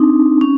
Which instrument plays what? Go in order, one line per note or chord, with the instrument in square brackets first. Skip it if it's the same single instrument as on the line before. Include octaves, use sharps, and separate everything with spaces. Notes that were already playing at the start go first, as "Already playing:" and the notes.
Already playing: [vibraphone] C4 D4 D#4
C#4